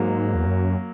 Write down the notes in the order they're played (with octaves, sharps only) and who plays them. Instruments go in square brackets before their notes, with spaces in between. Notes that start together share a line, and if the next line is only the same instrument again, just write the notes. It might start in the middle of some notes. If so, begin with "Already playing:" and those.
Already playing: [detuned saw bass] G#2 [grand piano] F#3 A#3
[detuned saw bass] E2
F#2